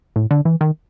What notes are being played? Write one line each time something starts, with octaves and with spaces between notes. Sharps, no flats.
A2
D3
E3
D#3